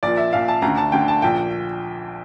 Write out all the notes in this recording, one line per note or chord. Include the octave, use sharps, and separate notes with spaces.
A#1 A#2 D5
E5
A#1 A#2 F5
A5
D2 A#5
D3
A5
D2 D3 G5
A5
A#1 A#2 G5